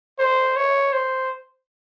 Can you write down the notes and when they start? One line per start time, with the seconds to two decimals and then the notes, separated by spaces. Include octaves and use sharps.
0.19 C5
0.56 C#5
0.93 C5